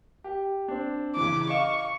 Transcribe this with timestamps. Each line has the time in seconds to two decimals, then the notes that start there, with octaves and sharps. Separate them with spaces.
0.24 G4
0.68 C4 D4
1.17 C#3 E3 D6
1.50 D#5 F5 C#6 E7